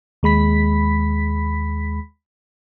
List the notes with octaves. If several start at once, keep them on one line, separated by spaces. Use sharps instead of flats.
D#2 G#3 B5 B6